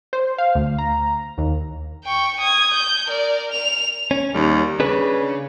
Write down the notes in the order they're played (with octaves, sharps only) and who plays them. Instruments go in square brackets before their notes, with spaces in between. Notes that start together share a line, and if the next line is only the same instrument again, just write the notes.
[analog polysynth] C5
F5
D2
A#5
D#2
[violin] G5 C#6
D#6 G#6
G6
A#4 D5
F7
[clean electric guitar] C#4
[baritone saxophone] D#2 [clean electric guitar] G3
[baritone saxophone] C#3 [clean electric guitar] D4 G#4 B4